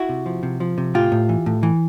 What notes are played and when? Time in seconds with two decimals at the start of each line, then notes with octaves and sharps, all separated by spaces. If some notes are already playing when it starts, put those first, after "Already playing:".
Already playing: E4 F#4
0.09 C3
0.26 F3
0.43 C3
0.60 F3
0.78 C3
0.94 A2 F4 G4
1.12 A2
1.29 E3
1.46 A2
1.63 E3